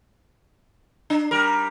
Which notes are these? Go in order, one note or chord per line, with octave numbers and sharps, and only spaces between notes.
D4
G3 A#4